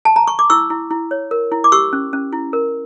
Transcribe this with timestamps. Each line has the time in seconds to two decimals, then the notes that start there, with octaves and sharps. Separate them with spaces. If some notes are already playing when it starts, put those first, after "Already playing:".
0.05 A5
0.16 A#5
0.27 C#6
0.39 D6
0.50 E4 C#6 E6
0.70 E4
0.91 E4
1.11 C#5
1.31 A#4
1.52 E4
1.64 D6
1.72 G4 C#6 E6
1.93 C#4
2.13 C#4
2.33 E4
2.53 A#4